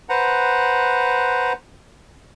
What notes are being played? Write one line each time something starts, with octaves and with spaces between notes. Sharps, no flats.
B4 C5 F#5 A#5